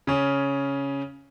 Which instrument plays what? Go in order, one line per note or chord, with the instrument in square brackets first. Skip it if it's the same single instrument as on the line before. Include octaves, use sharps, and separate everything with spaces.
[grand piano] C#3 C#4